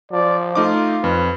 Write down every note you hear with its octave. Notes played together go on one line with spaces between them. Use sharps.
F3 D5
A3 D#4 F4 D6
F2 B4